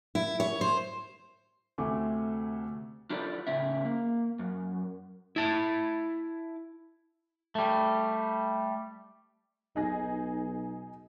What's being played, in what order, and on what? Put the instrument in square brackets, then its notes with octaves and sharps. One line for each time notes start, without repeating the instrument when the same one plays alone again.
[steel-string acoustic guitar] E4
C#5
C5
[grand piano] D2 C3 A3 G#5 C#6 D6
[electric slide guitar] D4 E4 F4 G4 A4 D5
A2 C#3 C#4 E5
A#3
F#2
E4 A5
[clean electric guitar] G3 A3
[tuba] B1 [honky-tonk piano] D#4 G#4 A#6